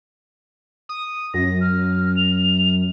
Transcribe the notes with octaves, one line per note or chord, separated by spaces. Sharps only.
D#6
F#2 A#6
F6
F7